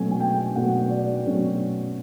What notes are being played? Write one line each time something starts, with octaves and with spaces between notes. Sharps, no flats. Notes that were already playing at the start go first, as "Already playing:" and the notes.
Already playing: B2 F#3 A3 C#4 G#5
G#5
G5
B2 F#3 A3 C#4 F#5
D5
B2 F#3 A3 C#4